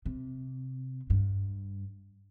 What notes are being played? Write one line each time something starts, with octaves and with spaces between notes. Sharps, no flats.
C3
G2